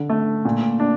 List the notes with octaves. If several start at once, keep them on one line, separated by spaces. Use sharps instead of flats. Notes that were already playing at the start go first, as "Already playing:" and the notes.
Already playing: D3
A3
A#2
D4